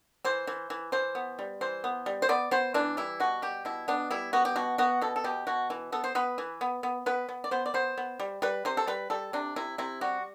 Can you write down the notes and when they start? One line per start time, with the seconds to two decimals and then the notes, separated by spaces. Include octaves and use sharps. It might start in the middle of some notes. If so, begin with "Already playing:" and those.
0.25 E3 C5
0.47 E3
0.70 E3
0.92 E3 C5
1.15 B3
1.39 G3
1.61 E3 C5
1.84 B3
2.06 G3
2.22 C5
2.29 B3 D5
2.51 B3 C5
2.74 E3 D4
2.97 G3 E4
3.20 B2 F#4
3.42 G3 G4
3.65 B2 E4
3.88 B3 D4
4.11 G3 E4
4.33 B3 F#4
4.45 G4
4.56 B2 F#4
4.78 B3 F#4
5.01 B2 A4
5.16 A4
5.24 B2 G4
5.47 B2 F#4
5.70 E3
5.92 B3 A4
6.04 C5
6.15 B3 B4
6.38 E3
6.61 B3
6.83 B3
7.06 B3 B4
7.29 B3
7.44 D5
7.51 B3 C5
7.66 D5
7.74 B3 C5
7.98 B3
8.20 G3
8.42 G3 B4
8.65 C3 C5
8.77 A4
8.87 G3 B4
9.10 G3 A4
9.33 C3 D4
9.56 C3 E4
9.78 C3 E4
10.01 G3 F#4